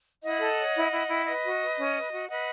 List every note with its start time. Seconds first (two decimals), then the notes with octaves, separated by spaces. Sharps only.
0.23 E4 D#5 F#5
0.40 A4
0.57 C#5
0.75 E4
0.92 E4
1.08 E4
1.26 B4 D#5
1.44 F#4
1.61 B4
1.77 C#4
1.95 B4
2.11 F#4
2.29 B4 D#5 F#5